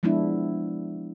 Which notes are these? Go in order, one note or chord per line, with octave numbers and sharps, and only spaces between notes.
F3 G#3 B3 D4 E4